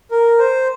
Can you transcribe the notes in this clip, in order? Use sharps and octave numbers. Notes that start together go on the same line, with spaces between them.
A#4
C5